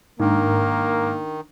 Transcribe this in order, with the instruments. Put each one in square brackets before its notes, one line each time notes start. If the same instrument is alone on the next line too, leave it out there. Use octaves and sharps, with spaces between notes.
[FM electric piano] G#2 [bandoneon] D#3 [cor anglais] A#3 [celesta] D4 D#4